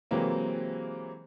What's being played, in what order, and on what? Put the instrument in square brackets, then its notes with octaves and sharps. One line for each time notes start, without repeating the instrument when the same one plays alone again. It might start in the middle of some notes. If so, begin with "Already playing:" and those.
[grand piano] C3 E3 F#3 G#3 A#3 C4